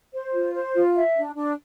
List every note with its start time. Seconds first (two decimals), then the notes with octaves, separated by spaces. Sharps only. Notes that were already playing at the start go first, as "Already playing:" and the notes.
0.13 C5
0.34 F4
0.54 C5
0.75 F4
0.95 E5
1.16 D4
1.35 D4